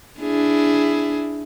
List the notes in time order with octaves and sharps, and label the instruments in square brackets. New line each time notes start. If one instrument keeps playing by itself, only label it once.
[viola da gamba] D4 E4 G#4